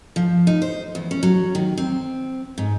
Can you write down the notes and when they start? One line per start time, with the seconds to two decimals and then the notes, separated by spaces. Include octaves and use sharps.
0.16 F3
0.47 D#4
0.62 C5
0.95 E2
1.11 C#4
1.23 F#3
1.55 D#3
1.78 C4
2.58 G#2